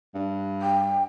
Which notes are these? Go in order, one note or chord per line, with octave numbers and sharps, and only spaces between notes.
G2
G5